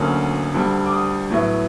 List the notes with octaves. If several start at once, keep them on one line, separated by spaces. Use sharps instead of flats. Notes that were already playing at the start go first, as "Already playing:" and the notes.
Already playing: D2 D3 F#3 A#3 C#4 D#6
D2 D3 G3
D6
D#6
A2 F#3 B3 E4